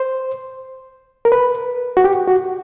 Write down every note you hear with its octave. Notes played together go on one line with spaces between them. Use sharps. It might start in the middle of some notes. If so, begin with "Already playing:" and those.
Already playing: C5
A#4
B4
F#4
G4
F#4